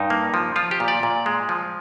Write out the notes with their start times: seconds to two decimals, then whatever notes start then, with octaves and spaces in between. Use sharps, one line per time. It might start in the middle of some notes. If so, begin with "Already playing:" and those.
Already playing: G2 D#4
0.10 A#3
0.34 F3
0.56 F3 F4
0.71 G4
0.80 A#2
0.88 D5
1.03 A#2
1.26 G#3
1.49 F3